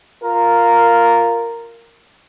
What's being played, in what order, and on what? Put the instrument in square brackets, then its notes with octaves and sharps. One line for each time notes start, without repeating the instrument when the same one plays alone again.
[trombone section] F4 A#4